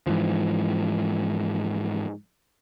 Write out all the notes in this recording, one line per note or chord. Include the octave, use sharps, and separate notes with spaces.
G#2 E3 F3